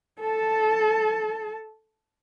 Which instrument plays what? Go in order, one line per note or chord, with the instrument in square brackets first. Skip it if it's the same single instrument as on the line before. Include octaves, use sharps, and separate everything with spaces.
[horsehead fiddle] A4 A5